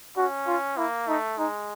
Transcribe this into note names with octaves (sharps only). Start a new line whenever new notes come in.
C#4 F#4
F4
A#3 E4
A3 D#4
G#3 D#4